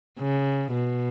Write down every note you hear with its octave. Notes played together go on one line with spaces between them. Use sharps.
C#3
B2